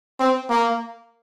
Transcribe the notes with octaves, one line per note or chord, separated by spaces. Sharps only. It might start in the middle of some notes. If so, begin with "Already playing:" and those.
C4
A#3